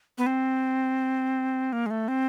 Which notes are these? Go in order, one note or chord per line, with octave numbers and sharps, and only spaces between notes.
B3
C4
A#3
G#3
A3
C4